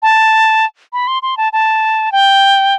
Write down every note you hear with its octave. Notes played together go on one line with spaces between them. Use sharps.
A5
B5
C6
C6
A5
A5
G5